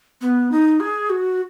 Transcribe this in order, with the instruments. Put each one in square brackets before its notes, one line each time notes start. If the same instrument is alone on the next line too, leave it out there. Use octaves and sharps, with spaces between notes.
[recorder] B3
D#4
G#4
F#4